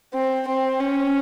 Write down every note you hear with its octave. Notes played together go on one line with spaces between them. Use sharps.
C4
C4
C#4